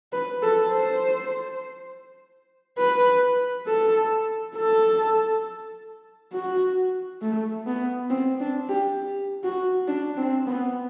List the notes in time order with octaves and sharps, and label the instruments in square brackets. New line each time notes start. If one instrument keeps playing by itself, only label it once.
[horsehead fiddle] B4
A4
C5
B4
A4
A4
F#4
A3
B3
C4
D4
G4
F#4
D4
C4
B3